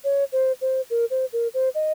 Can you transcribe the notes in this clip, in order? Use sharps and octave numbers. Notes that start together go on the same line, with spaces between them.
C#5
C5
C5
A#4
C5
A#4
C5
D#5